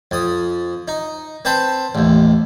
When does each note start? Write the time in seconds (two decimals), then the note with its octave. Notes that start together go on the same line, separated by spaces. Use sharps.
0.11 F2 D#6
0.88 D#4
1.45 C4 B4 C5 G5 A5
1.95 A1 D#2